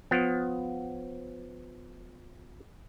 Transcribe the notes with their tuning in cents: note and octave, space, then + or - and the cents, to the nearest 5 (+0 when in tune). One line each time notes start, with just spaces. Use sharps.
F3 +30 B3 +25